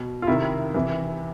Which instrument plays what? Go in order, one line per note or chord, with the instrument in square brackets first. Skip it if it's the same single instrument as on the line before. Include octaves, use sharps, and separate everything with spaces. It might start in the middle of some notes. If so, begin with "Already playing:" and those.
Already playing: [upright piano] B2
F4
C3 D#3 E4
C3 E3